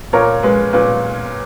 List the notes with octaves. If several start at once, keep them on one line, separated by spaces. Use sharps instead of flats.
A#2 A#4 C#5
G#3 B4
A#2 B4